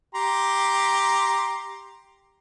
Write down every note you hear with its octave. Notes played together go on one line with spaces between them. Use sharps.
G4 A#5 C6